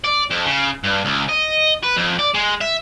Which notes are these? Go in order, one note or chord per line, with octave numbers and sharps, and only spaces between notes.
D5
F2
C#3
G2
C#2
D#5
B4
F2
D5
G#3
E5